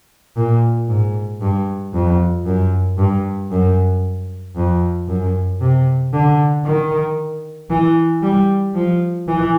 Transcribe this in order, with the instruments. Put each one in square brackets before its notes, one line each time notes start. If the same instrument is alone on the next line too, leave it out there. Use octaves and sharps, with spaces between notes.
[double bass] A#2
G#2
G2
F2
F#2
G2
F#2
F2
F#2
C3
D3
D#3
E3
G3
F3
E3